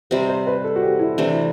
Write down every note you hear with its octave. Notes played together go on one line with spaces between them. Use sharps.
C3 G3 C4 C5
C5
B4
A4
F#4
G4
E4
C3 E3 A3 C4 D4